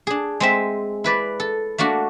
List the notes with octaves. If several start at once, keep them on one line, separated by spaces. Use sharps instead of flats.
D4 G#4
G#3 C4 E5
E4 B4 D5
A4
A3 A#3 D4 F#4